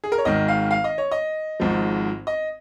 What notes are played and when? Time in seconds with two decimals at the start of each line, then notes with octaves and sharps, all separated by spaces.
0.04 G#4
0.12 A#4
0.18 C#5
0.25 G#1 G#2 D#3 D#5
0.48 F5
0.71 F5
0.84 D#5
0.98 C#5
1.11 D#5
1.60 G#1 G#2 F3
2.27 D#5